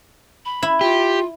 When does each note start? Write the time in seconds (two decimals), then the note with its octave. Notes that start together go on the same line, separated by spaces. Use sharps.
0.45 B5
0.63 E4
0.81 F4 G4